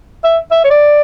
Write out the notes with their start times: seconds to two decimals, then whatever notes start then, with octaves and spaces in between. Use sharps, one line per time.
0.24 E5
0.51 E5
0.64 C#5
0.70 D5